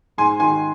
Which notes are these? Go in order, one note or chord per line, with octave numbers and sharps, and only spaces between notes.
G#2 G#5 C6
D#3 G#5 C6